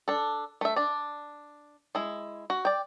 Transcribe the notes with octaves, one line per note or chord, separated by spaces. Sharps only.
D4 A4
A3 E5
D4 D5
G#3 E4
F#4
D5 G5